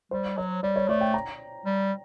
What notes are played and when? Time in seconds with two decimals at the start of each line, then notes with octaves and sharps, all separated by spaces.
0.11 G3 C5
0.37 F#3 C#5
0.63 G3 D5
0.76 C#5
0.88 A3 D5
1.01 G5
1.14 A#5
1.66 G3